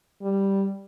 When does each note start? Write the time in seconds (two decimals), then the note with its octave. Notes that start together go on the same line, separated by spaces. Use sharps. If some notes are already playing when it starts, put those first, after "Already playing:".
0.22 G3